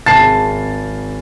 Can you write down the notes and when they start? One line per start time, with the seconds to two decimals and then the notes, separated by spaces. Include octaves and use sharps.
0.06 G#1 A5 A6 C7